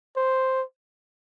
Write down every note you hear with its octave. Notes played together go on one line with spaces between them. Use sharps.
C5